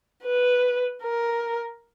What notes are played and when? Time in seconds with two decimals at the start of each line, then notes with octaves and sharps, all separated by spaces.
0.24 B4
1.03 A#4